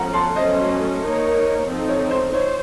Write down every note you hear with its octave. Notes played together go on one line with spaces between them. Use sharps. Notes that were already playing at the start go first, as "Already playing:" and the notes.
Already playing: F3 A3 C#4 F#5 A#5
A5 C6
F#3 A3 C#4 A4 C5 D#5
A#3 D#4 A#4 C#5
F3 C4 D#4 A4
C#5
C5
C5 C#5